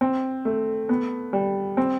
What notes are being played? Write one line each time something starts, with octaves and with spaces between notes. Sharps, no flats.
C4
A3
B3
G3
C4